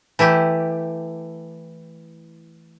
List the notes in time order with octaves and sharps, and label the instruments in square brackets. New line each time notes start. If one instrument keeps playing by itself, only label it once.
[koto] E3 A3 E4 G4